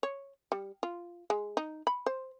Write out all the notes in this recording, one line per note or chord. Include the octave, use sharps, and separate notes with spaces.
C#5
G3
F4
G#3
D#4
B5
C5